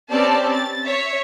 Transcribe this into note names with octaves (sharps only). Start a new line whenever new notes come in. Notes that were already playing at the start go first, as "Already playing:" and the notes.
C4 C#4 G4 B4 D5 A5
A6
C#5 E5